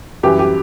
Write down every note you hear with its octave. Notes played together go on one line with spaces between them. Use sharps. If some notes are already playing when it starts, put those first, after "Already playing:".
F#2 E3 G3 G4
G4